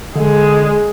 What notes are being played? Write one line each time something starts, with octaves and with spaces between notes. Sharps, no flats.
D3 G#3